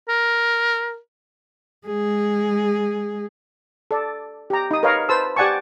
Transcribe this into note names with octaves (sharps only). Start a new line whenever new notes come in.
A#4
G#3 G#4
A4 D5
G4 A#5
D#4 D#6
A#4 B4 C#5 D#5 F5
B4 C5 A5 E6
G4 D5 F#5 G#5 A5 C#6